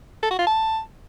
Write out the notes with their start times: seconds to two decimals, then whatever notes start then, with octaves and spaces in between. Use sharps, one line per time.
0.23 A4
0.31 F#4
0.39 F4
0.47 A5